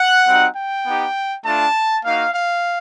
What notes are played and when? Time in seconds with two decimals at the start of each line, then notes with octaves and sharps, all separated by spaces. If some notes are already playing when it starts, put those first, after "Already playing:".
Already playing: F#5
0.26 G3 C4 D#4 F#4
0.56 G5
0.85 B3 D#4 G4
1.45 A3 D4 F4 A5
2.05 A#3 D#4 F#4 F5
2.34 F5